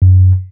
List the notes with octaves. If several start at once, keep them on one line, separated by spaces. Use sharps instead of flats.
F#2